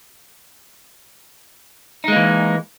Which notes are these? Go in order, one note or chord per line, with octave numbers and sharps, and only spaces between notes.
E3 G#3 A#3 D#4